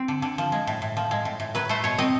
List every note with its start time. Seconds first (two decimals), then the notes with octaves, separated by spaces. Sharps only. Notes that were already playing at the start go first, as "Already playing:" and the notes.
Already playing: C4
0.08 D3
0.22 D3
0.38 F3
0.52 G#3
0.67 A2
0.82 A2
0.97 F3
1.11 G#3
1.25 A2
1.40 A2
1.55 F#3 B4
1.69 A3 C5
1.84 B2 C#5
1.98 C4 D#5